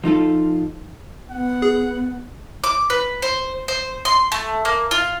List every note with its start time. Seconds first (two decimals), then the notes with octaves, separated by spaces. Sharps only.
0.04 F3 D#4 F4 A4
1.30 B3 F#5
1.62 G#4
2.64 D6
2.90 B4
3.22 C5
3.68 C5
4.05 C6
4.32 A3
4.65 A#3
4.91 F4